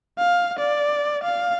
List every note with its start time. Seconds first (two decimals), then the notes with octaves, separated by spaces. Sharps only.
0.18 F5
0.59 D5
1.23 F5